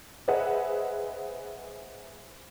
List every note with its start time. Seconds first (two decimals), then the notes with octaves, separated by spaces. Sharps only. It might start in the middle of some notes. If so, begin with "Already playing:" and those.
0.28 G#4 B4 C5 D#5 E5 F#5